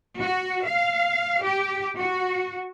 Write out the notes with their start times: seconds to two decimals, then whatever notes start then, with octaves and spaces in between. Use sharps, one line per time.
0.19 F#4
0.65 F5
1.44 G4
1.96 F#4